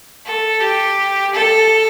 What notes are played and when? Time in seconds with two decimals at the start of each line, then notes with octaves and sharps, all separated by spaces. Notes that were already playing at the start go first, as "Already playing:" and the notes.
0.27 A4
0.61 G4
1.33 A4